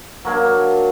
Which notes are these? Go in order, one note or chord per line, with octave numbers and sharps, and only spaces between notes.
F#3 A#3 D4